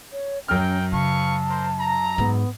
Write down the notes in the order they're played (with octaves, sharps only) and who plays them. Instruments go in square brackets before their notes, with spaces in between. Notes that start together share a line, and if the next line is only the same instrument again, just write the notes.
[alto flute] C#5
[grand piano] F#2 F6 [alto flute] C#4 [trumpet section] A#4 G5
[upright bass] C#3 [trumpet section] B4 F5 C#6 [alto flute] A5
[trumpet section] A#4 C5
A#5
[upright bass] G#2 [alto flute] B3